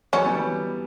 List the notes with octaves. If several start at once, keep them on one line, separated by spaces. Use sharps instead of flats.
F#3 A3 C#4
G3 B3
E3 G3